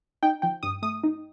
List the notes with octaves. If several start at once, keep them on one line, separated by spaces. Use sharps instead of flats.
D#4 G5
F3 G5
G2 D#6
A3 D#6
D#4